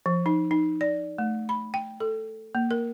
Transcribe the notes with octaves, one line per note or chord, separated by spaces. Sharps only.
F3
D#4
D#4
D5
A3
B5
G5
A4
A#3
A#4